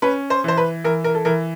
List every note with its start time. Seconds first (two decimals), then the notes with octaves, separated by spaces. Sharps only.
0.02 C#4 B4
0.30 C5
0.44 E3 C5
0.57 B4
0.84 E3 A#4
1.04 A#4
1.15 A4
1.25 E3 A#4